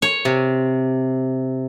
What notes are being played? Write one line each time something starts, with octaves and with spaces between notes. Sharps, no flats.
C#5
C3